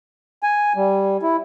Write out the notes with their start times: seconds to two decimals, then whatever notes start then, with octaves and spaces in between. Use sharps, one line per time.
0.43 G#5
0.76 G3
1.23 E4